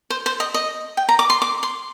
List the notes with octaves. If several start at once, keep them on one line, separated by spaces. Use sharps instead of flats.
C5
C5
D#5
D#5
G5
A#5
D6
C6
D6
C6